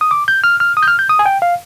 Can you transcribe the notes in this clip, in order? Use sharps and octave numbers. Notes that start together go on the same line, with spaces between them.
D#6
D6
G6
F6
F6
D#6
G6
F6
G6
D#6
G#5
G5
F5